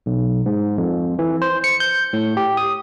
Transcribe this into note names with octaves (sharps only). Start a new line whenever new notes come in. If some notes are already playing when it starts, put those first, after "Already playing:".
B1
G#2
F2
E3
C5
C#7
G6
A2
G4
D#6